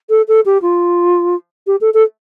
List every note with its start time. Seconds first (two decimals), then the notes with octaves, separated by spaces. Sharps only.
0.10 A4
0.28 A4
0.46 G4
0.62 F4
1.67 G4
1.81 A4
1.94 A4